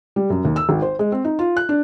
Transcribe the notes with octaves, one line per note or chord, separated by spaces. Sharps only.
G3
F#2
D#2
E6
G#1
C5
G#3
C4
D#4
F4
F#6
D4